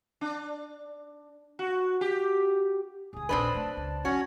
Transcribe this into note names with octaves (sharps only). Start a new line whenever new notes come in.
D4
F#4
G4
C#2 E4 G#4 G#5 D#6
A#1 D#2 C4 D4 B4
F#3 A3 D5 A5
C#2
D#3 F#3 C#4 F#4 C#5